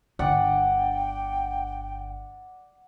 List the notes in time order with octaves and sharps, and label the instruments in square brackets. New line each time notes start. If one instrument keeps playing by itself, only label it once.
[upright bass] G1 D3 [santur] D5 F#5 [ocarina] G5